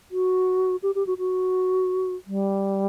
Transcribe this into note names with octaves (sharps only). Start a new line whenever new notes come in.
F#4
G4
G4
F#4
F#4
G3